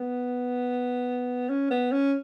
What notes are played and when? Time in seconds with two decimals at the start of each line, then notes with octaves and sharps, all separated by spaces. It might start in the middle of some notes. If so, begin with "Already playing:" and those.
Already playing: B3
1.49 C#4
1.70 B3
1.92 C#4